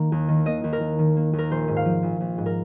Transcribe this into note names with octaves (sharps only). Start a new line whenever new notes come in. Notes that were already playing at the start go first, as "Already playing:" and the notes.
Already playing: D#3 A#3 A#5
D#2
D#3
A#3 D#5
D#2
A#4
D#2
D#3
A#3
D#2
A#4
A#1 C5
G#2
F5
F3
A#1
A#1
G#2
A#4